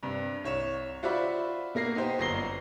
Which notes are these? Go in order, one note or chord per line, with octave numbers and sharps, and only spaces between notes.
G2 C3
C2 C#5 E7
F4 F#4 C5 D5 E5 B5
B2 A#3 A#6 C7
B3 D#4 G4 C5
G1 F#2 A#6 C7 G7